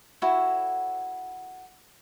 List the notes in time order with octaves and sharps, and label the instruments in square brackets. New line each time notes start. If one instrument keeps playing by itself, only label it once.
[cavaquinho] E4 F#4 A4 C#5